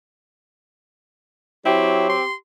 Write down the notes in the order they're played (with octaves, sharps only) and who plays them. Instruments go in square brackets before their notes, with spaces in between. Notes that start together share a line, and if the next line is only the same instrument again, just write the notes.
[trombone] F#3 [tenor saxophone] C4 [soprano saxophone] E4 [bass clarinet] G4
[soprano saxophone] C6